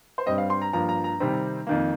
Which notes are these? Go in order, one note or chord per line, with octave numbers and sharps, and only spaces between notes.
C5
G2 G3 C4 D#5
F5
C6
A#5
G2 F3 A#3 A#5
A#5
A#5
C3 D#3 G3 C4
F2 D#3 A#3